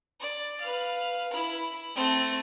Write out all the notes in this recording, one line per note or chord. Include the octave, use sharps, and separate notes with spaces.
D5
B4 F5
E4 B5
A3 C4